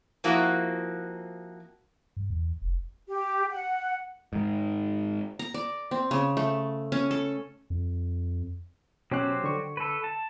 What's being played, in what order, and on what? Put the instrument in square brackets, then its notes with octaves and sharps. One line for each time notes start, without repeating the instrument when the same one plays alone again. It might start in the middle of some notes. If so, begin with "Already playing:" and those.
[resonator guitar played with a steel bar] F3 A#3 C4 E4 F#4
[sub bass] G2
E2
F1
[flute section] G4
F#5
[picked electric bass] G#2 D#3
[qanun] A#5
D5
C4
C#3
A3
C#4
A4
[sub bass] F2
[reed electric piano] B2 C#4 F#6 [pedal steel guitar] F#3 G4 C5
[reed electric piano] D3 C#6
[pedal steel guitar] A4 B4
A5